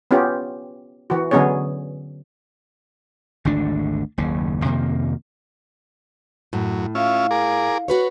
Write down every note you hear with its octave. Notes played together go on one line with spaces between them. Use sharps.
B3 C#4 F4 G4
E3 F#4
D3 F#3 B3 C#4 G#4 C#5
G#1 D2 D3 D4
F#1 D#2 C#3
F2 C3 D#3 A#3
F#2 A2
C#4 E4 F4 F5
G#4 A#4 D6
F#4 B4 C#5